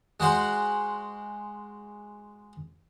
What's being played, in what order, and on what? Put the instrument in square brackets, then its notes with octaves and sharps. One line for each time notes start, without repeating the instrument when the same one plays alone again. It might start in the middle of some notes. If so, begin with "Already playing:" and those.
[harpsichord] G#3 F#4 C5 F#5